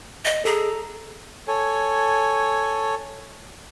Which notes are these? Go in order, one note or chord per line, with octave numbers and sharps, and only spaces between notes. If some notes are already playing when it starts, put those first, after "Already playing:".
D#5
G#4 A4 A#5
A4 C#5 G#5